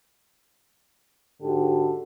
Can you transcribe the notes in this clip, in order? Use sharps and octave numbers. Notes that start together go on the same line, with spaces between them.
G#2 D3 D4 F#4 G4